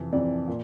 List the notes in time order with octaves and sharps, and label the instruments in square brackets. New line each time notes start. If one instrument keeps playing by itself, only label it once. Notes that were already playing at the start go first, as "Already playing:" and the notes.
Already playing: [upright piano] F2 C3 E3
F2 C3 E3 D5
A#2